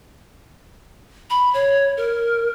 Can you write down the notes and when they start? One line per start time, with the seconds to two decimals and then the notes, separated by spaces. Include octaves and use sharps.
1.30 B5
1.54 C#5
1.97 A#4